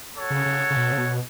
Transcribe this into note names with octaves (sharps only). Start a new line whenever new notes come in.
F#4 A4 C#5
C#3
C#3
C#3
B2
C#3
B2